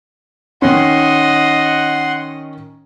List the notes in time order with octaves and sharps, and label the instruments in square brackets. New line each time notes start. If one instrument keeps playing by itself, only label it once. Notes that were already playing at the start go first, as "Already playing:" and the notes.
[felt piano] D#3 C#4 [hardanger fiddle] D#5 [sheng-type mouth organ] F#5 C6